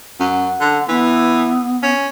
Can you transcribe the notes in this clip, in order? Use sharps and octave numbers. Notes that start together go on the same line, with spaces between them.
F#2 F#5
D3
E3 B3
C#4